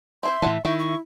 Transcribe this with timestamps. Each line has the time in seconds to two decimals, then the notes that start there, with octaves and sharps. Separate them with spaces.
0.23 C4 E4 C5 E5 C6
0.42 A2 E3 E4 F#5 A5
0.65 D#3 E4 E5 G5 C#6
0.79 C#6